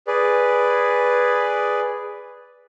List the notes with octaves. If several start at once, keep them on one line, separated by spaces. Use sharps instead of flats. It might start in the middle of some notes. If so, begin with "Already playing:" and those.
G#4 B4 D5